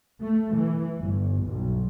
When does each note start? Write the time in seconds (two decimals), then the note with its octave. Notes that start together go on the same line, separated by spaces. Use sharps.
0.22 A3
0.56 E3
0.99 G1
1.45 B1